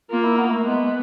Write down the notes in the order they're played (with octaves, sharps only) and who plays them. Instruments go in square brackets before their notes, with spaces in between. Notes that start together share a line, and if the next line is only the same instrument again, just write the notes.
[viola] A#3 [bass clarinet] F4
[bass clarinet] E4
B3
A3
[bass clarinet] G#3 [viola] B3
[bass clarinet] G#3